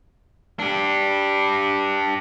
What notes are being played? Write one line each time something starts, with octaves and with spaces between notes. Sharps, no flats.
D4 G4